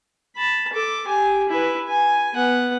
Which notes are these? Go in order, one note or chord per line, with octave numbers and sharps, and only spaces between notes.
A5 B5
A4 D6
G4 G#5
E4 B4
G#5
B3 F#5